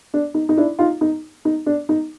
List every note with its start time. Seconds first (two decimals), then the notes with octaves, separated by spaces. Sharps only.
0.14 D4
0.34 D#4
0.49 D#4
0.57 D4 E4
0.79 D#4 F4
1.01 D#4
1.45 D#4
1.66 D4
1.89 D#4